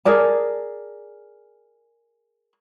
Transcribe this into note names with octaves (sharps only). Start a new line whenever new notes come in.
G#4 A#4 D5 A5